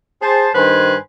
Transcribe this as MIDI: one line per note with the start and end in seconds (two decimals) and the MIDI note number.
0.22 0.49 68
0.22 0.49 72
0.22 0.49 81
0.54 0.95 43
0.54 0.95 51
0.54 0.95 71
0.54 0.95 72
0.54 0.95 80
0.54 0.95 83